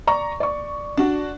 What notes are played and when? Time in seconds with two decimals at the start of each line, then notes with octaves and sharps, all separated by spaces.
0.07 D5 A#5 C#6
0.40 D5 C#6
0.97 D4 F#4